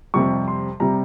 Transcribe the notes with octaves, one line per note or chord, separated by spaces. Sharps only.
F2 C3 G3 C#6
C6
C3 G3 A#5